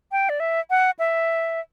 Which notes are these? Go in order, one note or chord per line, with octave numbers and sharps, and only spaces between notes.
G5
D5
E5
F#5
E5